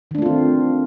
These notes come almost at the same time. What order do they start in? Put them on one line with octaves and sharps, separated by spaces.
D#3 D4 A3 F4 C4